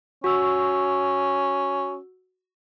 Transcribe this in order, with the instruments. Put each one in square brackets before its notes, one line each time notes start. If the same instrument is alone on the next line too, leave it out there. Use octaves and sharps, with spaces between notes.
[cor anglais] C#4 [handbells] F#4 E6